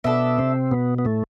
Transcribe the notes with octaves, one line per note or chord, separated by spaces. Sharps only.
B2 B3 D4 A4 E5
C3 C4
B2 B3
B3
A2 A3